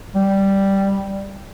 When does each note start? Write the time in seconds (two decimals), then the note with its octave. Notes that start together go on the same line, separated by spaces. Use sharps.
0.15 G3